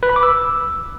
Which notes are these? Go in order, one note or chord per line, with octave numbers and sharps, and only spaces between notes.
B4
B5
D6
E6